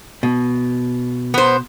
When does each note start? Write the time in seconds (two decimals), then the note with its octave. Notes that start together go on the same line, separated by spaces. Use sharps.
0.23 B2
1.34 B3 C5